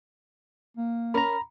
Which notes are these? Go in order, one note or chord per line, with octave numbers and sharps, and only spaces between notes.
A#3
C#4 A#4 A#5 B5